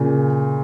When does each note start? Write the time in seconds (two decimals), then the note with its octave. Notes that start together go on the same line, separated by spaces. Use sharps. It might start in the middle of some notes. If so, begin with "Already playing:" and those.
Already playing: A#2 C#3